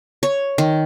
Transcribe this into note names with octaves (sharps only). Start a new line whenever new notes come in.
C#5
D#3